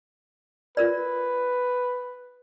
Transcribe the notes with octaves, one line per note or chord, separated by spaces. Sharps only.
F4 A#4 B4 D5